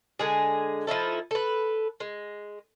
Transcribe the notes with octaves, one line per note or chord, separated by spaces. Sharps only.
D3 G#3 G#4
F3 D#4 E4 A4
A4 B4
G#3